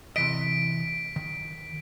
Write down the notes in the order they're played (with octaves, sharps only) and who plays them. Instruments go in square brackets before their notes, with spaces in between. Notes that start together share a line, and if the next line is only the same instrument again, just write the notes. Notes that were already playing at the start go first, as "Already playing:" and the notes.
[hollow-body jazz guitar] C3 E3 D#5 [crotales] B6 D7
[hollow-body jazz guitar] D#3